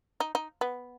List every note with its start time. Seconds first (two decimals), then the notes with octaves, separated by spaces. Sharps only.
0.20 D#4
0.35 D#4
0.61 B3